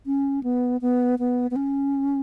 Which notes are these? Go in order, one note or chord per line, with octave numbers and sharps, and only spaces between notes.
C#4
B3
B3
B3
B3
C#4